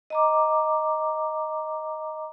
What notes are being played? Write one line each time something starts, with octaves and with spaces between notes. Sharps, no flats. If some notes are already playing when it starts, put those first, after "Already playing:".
D#5 A#5 D6